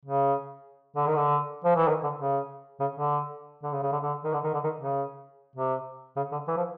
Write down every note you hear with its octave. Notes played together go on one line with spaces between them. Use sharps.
C#3
D3
D#3
D3
F3
E3
D#3
D3
C#3
C#3
D3
D3
C#3
C#3
D3
D3
D#3
D3
D#3
D3
D#3
C#3
C3
C#3
D3
E3
F3